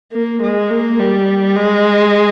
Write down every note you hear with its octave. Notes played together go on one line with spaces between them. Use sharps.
A#3
G#3
A#3
G3
G#3